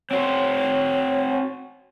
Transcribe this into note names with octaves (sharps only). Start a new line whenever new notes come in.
C4 F#4 C5 C#5